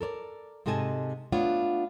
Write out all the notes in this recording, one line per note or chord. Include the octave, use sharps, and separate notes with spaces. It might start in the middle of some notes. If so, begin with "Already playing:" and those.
A4 A#4 C#5 D5
G#2 C3 A4 D#5 G#5 A5
A3 B3 D4 F4 C#5 F#5